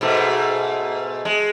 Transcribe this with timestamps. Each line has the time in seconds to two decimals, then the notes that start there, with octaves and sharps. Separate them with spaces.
0.01 G#2 B2 A3
1.25 G#3